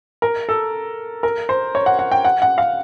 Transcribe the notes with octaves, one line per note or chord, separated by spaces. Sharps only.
A#4
A4
A#4
C5
C#5
F#5
F#5
G5
F#5
F#5
F5